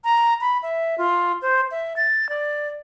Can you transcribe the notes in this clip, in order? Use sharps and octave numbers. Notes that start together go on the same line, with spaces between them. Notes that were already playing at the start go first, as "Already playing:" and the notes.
A#5
B5
E5
F4
C5
E5
A6
D5